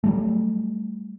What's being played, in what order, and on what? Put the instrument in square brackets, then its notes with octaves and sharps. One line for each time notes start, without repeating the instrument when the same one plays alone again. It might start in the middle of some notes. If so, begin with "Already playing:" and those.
[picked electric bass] F#3 G3 A3